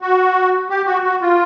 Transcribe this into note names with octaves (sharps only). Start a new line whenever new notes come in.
F#4
G4
F#4
F#4
F4